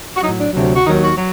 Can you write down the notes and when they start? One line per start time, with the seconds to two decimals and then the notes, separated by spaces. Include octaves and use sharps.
0.15 F#4
0.21 F#3 D#4
0.25 A2
0.38 D4
0.53 D2 C3 F#3
0.74 F#4
0.84 D#2 D#3 F#3 D#4
1.01 F#4
1.16 F#3